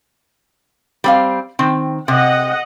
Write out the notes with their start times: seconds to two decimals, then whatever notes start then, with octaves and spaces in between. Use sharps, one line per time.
1.04 G3 C4 F5
1.59 D#3 C4
2.08 C3 D#5 F#5